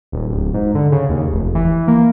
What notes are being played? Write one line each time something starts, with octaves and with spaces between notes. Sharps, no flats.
D#1
D1
G#2
D3
C#3
D#2
F1
E3
A#3